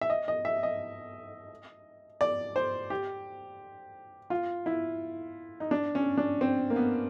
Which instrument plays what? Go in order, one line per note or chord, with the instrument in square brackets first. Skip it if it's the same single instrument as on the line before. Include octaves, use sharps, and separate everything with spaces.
[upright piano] E5
D#5
D#5
E5
D#5
D5
C5
G4
F4
E4
D#4
D4
C#4
D4
C4
A#3
B3